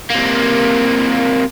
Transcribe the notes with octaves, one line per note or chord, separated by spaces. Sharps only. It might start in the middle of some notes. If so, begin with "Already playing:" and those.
C3 A#3